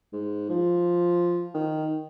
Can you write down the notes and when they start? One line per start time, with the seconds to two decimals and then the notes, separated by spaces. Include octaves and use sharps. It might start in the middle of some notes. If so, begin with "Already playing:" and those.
0.13 G#2
0.49 F3
1.54 D#3